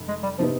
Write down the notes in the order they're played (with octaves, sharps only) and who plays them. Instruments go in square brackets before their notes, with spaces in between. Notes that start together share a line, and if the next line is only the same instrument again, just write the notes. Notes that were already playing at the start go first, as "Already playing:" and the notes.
Already playing: [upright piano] F1
[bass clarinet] G#3
G3
[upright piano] C3 D#3 B3 D#4 [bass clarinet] F3